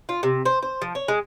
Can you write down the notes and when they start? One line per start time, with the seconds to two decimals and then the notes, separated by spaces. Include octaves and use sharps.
0.09 F4
0.23 C3
0.45 C5
0.62 C5
0.82 F3
0.95 C#5
1.08 G#3